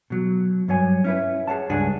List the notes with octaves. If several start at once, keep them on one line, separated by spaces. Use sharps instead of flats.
B2 F#3
G2 F#3 C#5 G#5
C#4 E4 B4
G#4 C#5 F#5 A5
C#2 G2 D4 G#4 F#5